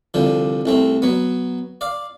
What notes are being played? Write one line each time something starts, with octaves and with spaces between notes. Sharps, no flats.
C2 D3 F3
C2 A3 C4
F#3 B3
D5 F5